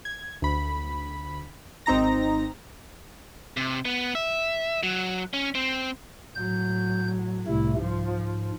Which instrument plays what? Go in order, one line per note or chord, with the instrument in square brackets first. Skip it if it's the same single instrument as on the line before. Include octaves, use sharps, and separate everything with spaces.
[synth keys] G#6
D2 B5
G#1 C4 D#4 A#5 A#6
[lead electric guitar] C3
B3
E5
F#3
C#4
C4
[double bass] A2 F#3 [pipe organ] G6
[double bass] C2 E4 [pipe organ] A2 C3 A3
[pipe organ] G#2 [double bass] F3